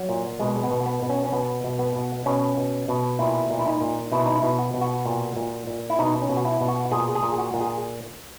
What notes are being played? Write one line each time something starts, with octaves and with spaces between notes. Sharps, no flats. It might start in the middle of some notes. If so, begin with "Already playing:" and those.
Already playing: F#3
A#2
B2 G#3
B3
B2
B3
B2
C#4
C#4
B2 B3
B2
B3
B2
B2 C#4
B2
B2
A#2 E4
A#2
E4
D#4
A#2
B2 E4
D#4
E4
B2
F#4
B2
F#4
A#2
A#2
A#2
E4
B2 D#4
C#4
B2
F#4
E4
B2
F#4
A#2 G#4
G#4
A#2
F#4
A#2
G#4